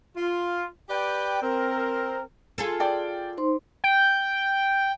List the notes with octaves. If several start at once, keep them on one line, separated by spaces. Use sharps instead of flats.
F4
G4 B4 D5 G5
C4 A#4
F4 G#4 A4
D5 G5 A5
D#4 C5 C6
G5